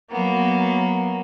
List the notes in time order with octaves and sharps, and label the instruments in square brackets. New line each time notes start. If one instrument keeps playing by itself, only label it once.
[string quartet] F#3 A#3 B3